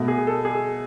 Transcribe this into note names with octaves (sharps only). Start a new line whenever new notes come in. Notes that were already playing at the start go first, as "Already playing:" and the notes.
Already playing: B2 A3
G#4
A4
G#4